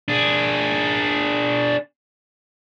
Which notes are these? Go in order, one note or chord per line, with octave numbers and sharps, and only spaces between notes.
D4 G#4